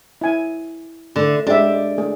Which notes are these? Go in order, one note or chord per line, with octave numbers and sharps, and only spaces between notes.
E4 G#5
D3 A3
G#3 D4 G4 E5
A3 G#4